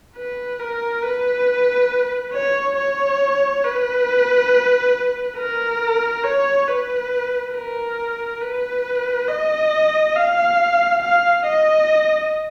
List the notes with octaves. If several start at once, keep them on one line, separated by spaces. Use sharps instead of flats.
B4
A#4
B4
C#5
C#5
B4
A#4
C#5
B4
A#4
B4
D#5
F5
F5
D#5